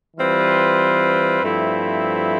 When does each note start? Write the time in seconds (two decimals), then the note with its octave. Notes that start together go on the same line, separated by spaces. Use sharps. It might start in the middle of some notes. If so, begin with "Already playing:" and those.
0.17 E3 G3 C4 F4 B4
1.42 G2 F3 A3 C4 E4